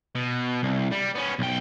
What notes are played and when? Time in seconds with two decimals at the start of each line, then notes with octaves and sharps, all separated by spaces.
0.15 B2
0.63 C2
0.92 G3
1.15 B3 C#4
1.39 B1 G5